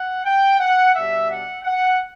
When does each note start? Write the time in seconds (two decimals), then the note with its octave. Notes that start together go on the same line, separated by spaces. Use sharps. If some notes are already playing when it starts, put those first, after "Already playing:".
Already playing: F#5
0.25 G5
0.59 F#5
0.95 B2 G3 D4 E5
1.30 F#5
1.64 F#5